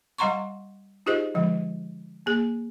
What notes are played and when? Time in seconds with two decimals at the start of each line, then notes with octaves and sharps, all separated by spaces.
0.18 G3 D#5 F#5 A#5 C6 C#6
1.06 D#4 F4 G4 G#4 C5 D#5
1.34 D3 F3 G#3
2.26 A#3 G#4